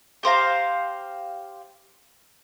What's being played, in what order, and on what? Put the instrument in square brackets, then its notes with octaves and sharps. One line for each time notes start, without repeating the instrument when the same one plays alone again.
[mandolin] G4 C5 F5 A#5